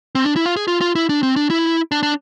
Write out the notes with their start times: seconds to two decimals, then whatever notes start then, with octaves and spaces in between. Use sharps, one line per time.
0.15 C4
0.25 D4
0.36 E4
0.46 F4
0.56 G#4
0.68 F4
0.81 F4
0.95 E4
1.09 D4
1.23 C4
1.36 D4
1.50 E4
1.92 D4
2.03 D4